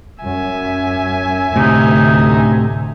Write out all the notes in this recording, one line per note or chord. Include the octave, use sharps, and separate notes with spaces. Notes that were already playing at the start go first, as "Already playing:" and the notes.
F#2 E5 G#5
D2 A2 C3 D#4